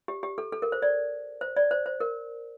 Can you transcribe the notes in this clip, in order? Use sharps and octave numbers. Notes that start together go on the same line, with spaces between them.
G4
G4
A4
A4
A#4
C5
D5
C5
D5
C5
C5
A#4